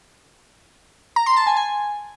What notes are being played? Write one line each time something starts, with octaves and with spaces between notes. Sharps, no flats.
A#5
C6
A5
G#5
G#5